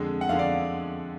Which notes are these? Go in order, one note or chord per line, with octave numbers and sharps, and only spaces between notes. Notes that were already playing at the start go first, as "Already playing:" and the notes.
Already playing: F2 D3 G#3
F#5
F2 D3 G#3 F5
D5